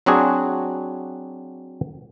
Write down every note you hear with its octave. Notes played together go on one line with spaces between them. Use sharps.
F#3 C4 D4 F#4 G#4